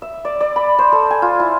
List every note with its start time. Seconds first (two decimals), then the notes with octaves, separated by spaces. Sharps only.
0.02 E5
0.25 D5
0.41 D5
0.56 B5
0.79 C5
0.92 A4
1.11 G#5
1.22 F4
1.40 E4